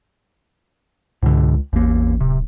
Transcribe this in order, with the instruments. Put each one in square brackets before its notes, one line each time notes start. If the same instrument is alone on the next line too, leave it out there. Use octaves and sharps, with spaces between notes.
[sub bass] C#2 [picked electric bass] G#2 B2 D3
[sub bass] A1 [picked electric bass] E2 A#3
[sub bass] D1 [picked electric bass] C3